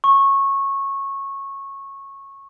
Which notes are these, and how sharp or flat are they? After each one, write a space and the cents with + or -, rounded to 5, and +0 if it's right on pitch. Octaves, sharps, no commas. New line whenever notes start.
C#6 -15